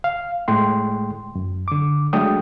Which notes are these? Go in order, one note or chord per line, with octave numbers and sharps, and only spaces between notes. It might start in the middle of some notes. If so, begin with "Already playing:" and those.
F5
A2 G#3 A3 G5 C6
F#2
D3 D6
F#3 G#3 A3 D4 G5 D#6